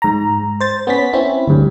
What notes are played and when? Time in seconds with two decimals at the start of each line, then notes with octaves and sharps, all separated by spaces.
0.02 G#2 A#5
0.60 C5 A6
0.87 B3 C#4 B6
1.13 C4 C#4 E4
1.48 D2 G2